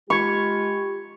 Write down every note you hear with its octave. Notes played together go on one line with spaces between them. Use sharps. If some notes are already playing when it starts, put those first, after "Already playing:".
G#3 F4 G4 B5 C#6 G#6